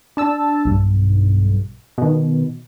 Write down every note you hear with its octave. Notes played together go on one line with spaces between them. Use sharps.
D4 A5 E6
B1 G2
B2 D#3